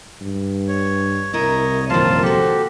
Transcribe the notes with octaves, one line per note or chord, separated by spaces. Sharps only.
G2
C#5
C2 E4 A#4 C#5 D#5
F#2 A#2 D#3 F3 F4 C5 F5 A5
F#4 G4 A4